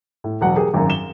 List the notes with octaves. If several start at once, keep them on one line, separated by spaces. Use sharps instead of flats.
A2
E1 F#3 F#5
G4 G#4 A#4
G#1 F#2
E7 G7